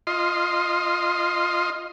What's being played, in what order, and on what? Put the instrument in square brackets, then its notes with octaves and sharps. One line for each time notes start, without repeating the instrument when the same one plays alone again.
[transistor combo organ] F4 D#5 C6